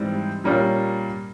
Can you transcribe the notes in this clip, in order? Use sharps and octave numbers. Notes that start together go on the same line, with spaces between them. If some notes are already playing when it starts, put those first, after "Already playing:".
Already playing: G#2 E3 G3 C4
A#2 G3 A#3 C#4